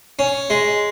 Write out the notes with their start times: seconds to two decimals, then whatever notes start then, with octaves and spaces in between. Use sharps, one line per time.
0.19 C#4
0.50 G#3